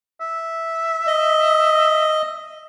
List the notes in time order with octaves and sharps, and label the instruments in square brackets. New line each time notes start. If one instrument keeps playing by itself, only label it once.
[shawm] E5
[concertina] D#5